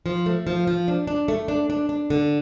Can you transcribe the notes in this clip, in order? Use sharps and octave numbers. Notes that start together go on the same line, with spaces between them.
F3
A3
F3
F3
D4
D4
A3
D4
D4
D4
D3